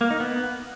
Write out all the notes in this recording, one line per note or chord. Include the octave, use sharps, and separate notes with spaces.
A#3
D#4
B3